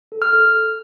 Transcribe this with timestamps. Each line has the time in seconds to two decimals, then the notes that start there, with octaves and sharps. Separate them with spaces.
0.12 A4
0.22 F6
0.33 A4